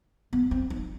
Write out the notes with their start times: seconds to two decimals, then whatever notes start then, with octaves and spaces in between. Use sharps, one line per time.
0.33 B3
0.51 C4
0.70 D#4